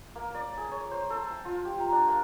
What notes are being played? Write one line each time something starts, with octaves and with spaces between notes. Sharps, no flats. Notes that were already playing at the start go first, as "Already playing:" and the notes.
A#3
D5
G#4
C#5
C5
A4
G#5
F4
G4
A#5
D4
A#3